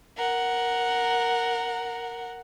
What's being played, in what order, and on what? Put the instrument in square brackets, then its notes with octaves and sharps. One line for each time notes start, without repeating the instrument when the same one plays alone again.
[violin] A#4 F#5